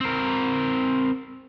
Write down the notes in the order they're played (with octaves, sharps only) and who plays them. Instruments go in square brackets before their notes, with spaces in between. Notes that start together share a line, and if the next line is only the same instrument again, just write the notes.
[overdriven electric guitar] C4 A#4